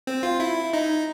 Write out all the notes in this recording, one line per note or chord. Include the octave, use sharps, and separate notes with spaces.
C4
F4
E4
D#4